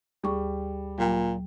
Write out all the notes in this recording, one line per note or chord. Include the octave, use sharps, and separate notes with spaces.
D2 G3 G#4 C#6
A#2 F#3 G5